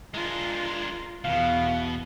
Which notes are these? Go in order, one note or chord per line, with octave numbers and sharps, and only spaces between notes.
G#3 D4 F4 A#4
E2 B2 B3 F5